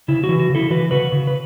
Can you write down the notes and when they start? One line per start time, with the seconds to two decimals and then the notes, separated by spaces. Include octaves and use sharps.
0.08 C#3 E4
0.24 F#4
0.29 E3
0.40 F#4
0.50 C#3
0.55 E4 A4
0.70 E3 F#4 B4
0.91 C#3 F#4 B4
1.12 C#3
1.27 B4